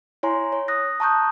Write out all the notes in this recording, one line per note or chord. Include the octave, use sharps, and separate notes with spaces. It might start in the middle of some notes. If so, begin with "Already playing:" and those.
E4 C#5 G#5 A#5 C6
C#5
D#6 F#6 A#6
A5 A#5 C#6 D#6 F#6 G6